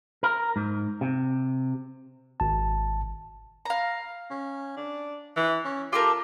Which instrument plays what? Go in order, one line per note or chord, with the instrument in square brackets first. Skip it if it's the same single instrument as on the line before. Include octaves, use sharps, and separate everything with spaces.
[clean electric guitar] A#4
G#2
C3
[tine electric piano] G#1 A5
[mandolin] F5 A#5
[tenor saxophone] C#4
D4
E3
C#4
[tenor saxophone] F4 [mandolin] G4 A4 A#4